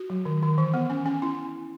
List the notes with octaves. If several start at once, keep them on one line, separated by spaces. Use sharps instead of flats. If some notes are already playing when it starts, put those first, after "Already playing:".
Already playing: F#4
F#3
D#3
D#3
E3
B3
C#4
C#4
E4